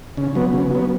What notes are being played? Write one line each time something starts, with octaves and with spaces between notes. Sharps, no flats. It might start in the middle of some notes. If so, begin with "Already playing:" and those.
C#3
F#3 B3
C#3
F#3 B3